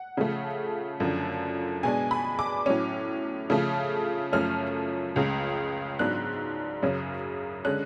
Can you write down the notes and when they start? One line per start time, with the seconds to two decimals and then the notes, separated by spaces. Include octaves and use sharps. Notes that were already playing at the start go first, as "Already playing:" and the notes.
Already playing: F#5
0.17 C#3 F3 A3
1.00 F#2 D3 F3
1.83 B2 G#3 D4 G#5
2.11 B5
2.39 D6
2.66 A2 F#3 C#4
3.50 C#3 F3 A3
4.32 F#2 F3 A3 C#4 F6
5.16 C#2 C#3 G#3
5.99 G#2 F#3 B3 D4 F#6
6.83 F#2 C#3 F#3 C#4
7.65 D3 G#3 C#4 F#6